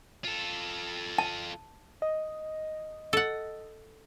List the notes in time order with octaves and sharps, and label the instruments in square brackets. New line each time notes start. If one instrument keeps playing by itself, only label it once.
[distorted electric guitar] F4 A4
[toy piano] A5
[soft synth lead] D#5
[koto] A4 F#5